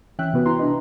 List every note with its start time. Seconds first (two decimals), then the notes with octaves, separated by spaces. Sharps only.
0.19 E3 C#4 E5 G5 F#6
0.33 C3 E3 B3 F#4 B4
0.46 E4 A#5 C6
0.59 D4 B4 D#5